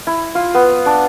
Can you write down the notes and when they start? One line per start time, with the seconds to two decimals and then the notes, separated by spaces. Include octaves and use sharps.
0.07 E4
0.35 F4
0.54 B3
0.86 D4